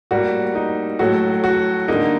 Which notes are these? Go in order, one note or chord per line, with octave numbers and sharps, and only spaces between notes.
A2 G3 A#3 F#4
D#4
A2 F#3 A3 F#4
F#4
D3 G3 A#3 D#4